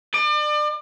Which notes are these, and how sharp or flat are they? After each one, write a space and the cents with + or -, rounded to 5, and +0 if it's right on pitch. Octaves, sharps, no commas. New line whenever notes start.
D5 +35